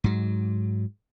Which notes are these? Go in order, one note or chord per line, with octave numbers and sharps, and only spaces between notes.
G#2 F#3